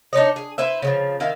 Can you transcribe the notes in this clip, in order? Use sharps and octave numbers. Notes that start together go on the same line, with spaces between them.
D4 D#4 C#5 D#5
G#4
E4 B4 C5 E5
C#3 E3 F3
D#3 E4 F5